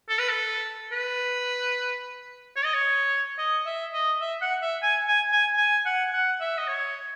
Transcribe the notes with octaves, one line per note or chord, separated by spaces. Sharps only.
A4
B4
A4
B4
C#5
D#5
C#5
D#5
E5
D#5
E5
F#5
E5
G#5
G#5
G#5
G#5
F#5
F#5
E5
D#5
C#5